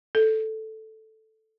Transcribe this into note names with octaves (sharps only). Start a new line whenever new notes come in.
A4